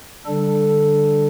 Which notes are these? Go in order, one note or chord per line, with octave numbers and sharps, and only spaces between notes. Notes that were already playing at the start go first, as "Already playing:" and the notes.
D3 G3 D4 A4